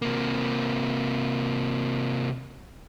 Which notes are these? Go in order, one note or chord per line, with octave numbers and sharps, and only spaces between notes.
C3 A#3